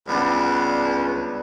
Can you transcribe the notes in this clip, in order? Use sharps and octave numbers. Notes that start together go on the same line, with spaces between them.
C#2 G3 B3 D4